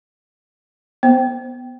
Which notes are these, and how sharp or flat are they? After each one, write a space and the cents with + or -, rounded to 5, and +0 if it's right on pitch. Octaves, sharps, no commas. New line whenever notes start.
B3 +0 C5 +0